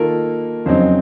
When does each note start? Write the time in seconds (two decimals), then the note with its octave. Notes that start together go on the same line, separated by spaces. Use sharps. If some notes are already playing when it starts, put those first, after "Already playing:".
Already playing: D#3 A#3 F4 A4 A#4
0.65 F2 C#3 F#3 C4 D#4 C5